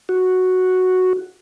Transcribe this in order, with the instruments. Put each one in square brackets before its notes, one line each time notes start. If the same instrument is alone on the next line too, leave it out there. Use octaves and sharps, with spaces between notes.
[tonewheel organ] F#4